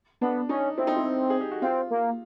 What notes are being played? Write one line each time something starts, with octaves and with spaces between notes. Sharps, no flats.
B3 D4
C#4 D#4
C4 E4
D#4
E4
G#4
G4
F#4
C4 F4
A#3